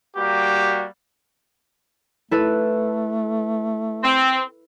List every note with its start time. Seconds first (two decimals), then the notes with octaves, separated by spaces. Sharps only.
0.16 G3 A#3 F#4 G4
2.31 A3 E4 A4 B4
4.03 C4